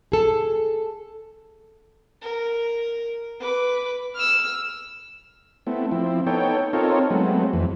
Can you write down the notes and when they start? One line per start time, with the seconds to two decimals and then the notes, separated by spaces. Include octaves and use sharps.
0.12 G#4 A4
2.22 A#4
3.40 B4 D6
4.15 E6 F6
5.67 A3 B3 C4 E4
5.91 F3 C4 E4
6.26 B3 D#4 A4 C#5 G5
6.73 C4 D#4 F4 A4 A#4 C#5
7.10 F#3 G#3 A3 B3 C4
7.53 F2 E3